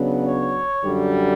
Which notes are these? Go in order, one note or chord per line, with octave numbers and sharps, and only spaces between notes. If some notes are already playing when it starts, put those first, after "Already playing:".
Already playing: C#3 F#3 B3 D4
C#5
F#2 D3 G3